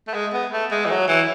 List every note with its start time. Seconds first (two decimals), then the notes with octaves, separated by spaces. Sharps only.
0.07 A3
0.14 G#3
0.33 B3
0.52 A3
0.71 G#3
0.86 E3
0.90 F#3
1.08 E3